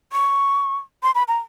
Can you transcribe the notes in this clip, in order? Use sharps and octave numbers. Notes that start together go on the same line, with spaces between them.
C#6
C6
B5
A#5